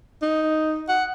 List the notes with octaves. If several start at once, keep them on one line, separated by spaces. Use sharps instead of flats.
D#4
F#5